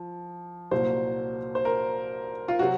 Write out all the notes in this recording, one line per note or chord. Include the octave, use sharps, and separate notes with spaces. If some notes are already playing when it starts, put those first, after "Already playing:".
Already playing: F3
C2 A#2 F#3 C5
C5
A#4
F4
C3 F#3 F#4